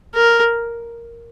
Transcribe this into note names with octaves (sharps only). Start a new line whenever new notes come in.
A#4